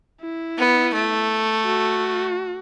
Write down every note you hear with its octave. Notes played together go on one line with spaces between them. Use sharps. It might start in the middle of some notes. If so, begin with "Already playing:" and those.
E4
B3
A3
F#4